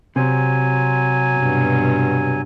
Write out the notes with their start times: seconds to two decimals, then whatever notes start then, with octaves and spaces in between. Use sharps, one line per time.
0.16 C3 F#3 G#5
1.35 G2 B2